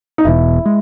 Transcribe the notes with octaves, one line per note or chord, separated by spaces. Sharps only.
D#4
E1 E2 B2 E4
G#3